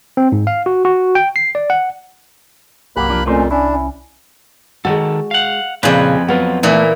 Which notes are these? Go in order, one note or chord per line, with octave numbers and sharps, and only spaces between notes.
C4
G#2
F5
F#4
F#4
G5
C7
D5
F#5
G1 C2 F#3 A#3 B3 G4 B5 F#6
F3 D4 G4
F2 A#2 A3 A#3 C#4 C5
C#4 D4 E4
C#4
D#3 G#3 F#4 A4
F5 F#5
F2 A#2 C#3 C4 E4 G#4 B4
F#3 B3 F4
A#2 E3 A3 A#3